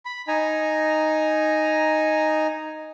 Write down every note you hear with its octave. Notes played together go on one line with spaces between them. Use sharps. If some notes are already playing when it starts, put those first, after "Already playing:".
B5
D#4 G#5 A#5